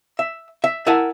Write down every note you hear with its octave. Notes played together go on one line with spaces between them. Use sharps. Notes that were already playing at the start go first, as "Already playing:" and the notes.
E5
E5
E4 A#4 E5 F#5 G#5 A5